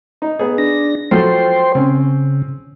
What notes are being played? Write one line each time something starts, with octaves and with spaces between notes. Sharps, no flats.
D#4
B3 G#4
D4 A#6
F3 F#3 A4 C5 G5 C6
C#3 C4 C#4